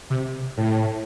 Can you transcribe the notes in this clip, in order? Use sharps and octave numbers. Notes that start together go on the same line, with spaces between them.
C3
A2